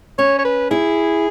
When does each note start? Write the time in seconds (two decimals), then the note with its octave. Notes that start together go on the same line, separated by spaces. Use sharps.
0.18 C#4 C#5
0.39 C#5
0.45 B4
0.71 E4 G#4